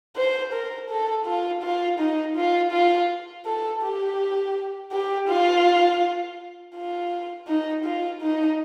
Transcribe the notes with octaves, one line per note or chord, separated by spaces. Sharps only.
C5
A#4
A4
F4
F4
D#4
F4
F4
A4
G4
G4
F4
F4
D#4
F4
D#4